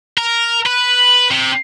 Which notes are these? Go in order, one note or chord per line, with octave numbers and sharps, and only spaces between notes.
A#4
B4
C3